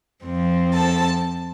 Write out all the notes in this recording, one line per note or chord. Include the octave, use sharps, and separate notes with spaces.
F2 F3 C4
A4 A5